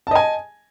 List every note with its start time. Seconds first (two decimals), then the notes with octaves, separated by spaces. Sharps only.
0.07 A5
0.11 D#5
0.15 G#5